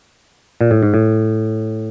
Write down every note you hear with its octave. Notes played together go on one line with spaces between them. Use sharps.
A#2
A2
G#2
A2